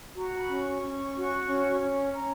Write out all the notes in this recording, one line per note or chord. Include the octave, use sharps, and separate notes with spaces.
F#4 A#5
B5
C#4
C#6
C#4
F#4
C#4
C#4
C#4 A#5